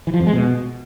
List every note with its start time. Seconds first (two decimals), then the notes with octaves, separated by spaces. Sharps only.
0.07 E3
0.14 F3
0.20 F2
0.27 G#3
0.33 B2